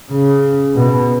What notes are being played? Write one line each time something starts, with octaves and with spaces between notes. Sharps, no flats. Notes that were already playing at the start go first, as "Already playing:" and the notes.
C#3
B2